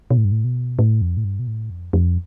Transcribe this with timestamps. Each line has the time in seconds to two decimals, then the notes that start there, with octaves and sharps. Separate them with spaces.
0.11 B2
0.17 A2
0.25 G2
0.32 A2
0.44 B2
0.79 A2
1.02 F2
1.17 A2
1.24 G2
1.39 B2
1.47 A2
1.70 F2
1.93 F2